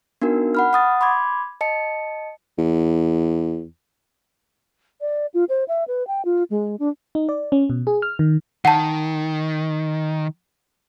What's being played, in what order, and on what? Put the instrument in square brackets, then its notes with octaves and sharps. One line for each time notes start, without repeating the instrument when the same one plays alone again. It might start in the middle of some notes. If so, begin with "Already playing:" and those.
[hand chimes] B3 D4 D#4 F#4 A#4
F#5 B5 F6
F#5 D#6 A6
B5 C6 D6 G#6
D#5 A5 C#7
[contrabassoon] E2
[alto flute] D5
F4
C5
E5
B4
G5
F4
G#3
D4
[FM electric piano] D#4
D5
C#4
B2
G#4
F6
D#3
[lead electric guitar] D#3 [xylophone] F#5 A5